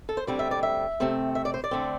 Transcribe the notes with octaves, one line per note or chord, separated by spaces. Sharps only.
A4
C5
D2 D3 G3 C4 D5
E5
D5
E5
C3 A3 C4
E5
D5
C5
D5
D3 A3 C4